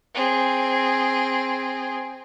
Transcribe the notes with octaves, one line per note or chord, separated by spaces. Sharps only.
C4 G#4